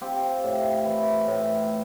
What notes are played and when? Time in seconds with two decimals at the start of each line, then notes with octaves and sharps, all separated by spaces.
0.01 C4 F4 G4
0.44 A2
0.85 E3
1.28 A2